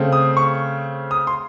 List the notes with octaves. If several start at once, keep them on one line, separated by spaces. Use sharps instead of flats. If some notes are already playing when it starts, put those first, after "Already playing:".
Already playing: C#3 A3 C4
D#6
C#6
D#6
C6